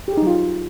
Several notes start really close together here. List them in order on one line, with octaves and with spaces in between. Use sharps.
G4 G#4 D#4 F#3 F4